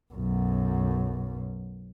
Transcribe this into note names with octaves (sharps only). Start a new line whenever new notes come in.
B1 F#2